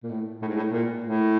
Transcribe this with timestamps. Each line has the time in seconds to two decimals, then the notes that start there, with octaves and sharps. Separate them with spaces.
0.03 A#2
0.10 A2
0.42 A2
0.48 G#2
0.57 A2
0.72 A#2
1.05 A2